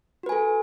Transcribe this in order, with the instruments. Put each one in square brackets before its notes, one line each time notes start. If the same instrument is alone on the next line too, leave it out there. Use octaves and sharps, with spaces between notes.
[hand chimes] F#4
B4
G#5
A4